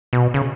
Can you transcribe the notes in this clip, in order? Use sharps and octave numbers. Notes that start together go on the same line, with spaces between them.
B2
C#3